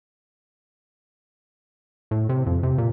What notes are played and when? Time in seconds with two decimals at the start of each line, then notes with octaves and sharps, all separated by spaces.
2.11 A2
2.29 C3
2.46 F2
2.63 C3
2.78 A#2